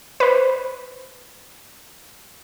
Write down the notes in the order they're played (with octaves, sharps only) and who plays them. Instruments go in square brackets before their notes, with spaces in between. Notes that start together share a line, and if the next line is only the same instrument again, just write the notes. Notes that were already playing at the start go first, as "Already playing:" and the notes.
[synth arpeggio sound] B4 C5